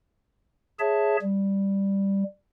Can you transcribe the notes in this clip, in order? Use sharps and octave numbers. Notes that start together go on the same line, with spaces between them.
G#4 C#5 E5 A5
G3